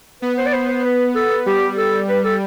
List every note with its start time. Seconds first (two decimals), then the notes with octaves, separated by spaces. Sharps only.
0.21 B3 B4
0.37 C5
0.46 D5
0.53 C5
0.69 C5
0.84 B4
1.15 A4
1.46 G3 G4
1.77 A4
2.09 B4
2.24 A4